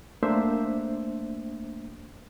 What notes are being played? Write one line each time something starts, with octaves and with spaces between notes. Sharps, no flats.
A3 A#3 D4 C5 E5